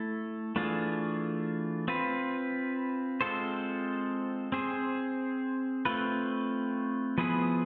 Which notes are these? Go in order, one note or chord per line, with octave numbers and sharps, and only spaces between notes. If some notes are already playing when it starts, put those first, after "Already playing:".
Already playing: A3 E4 A4
E3 A3 D4 F4 G#4
C4 F4 B4
G#3 C4 F4 A4 C5
C4 G#4 C5
A3 C4 F4 B4
F3 B3 E4 G#4 B4